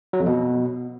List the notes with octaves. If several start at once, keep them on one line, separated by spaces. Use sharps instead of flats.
F#3
F2
B2